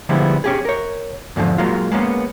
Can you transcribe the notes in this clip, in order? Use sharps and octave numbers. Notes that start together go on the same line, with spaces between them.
D3 F3 G3 G#3 B3 E4
C#4 G4 G#4
A#4 C#5
E2 G#2 D3 F3
F#3 G#3 A#3 F4
G#3 A#3 B3 C#4